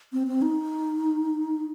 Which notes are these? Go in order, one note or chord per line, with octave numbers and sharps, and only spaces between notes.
C4
C4
D#4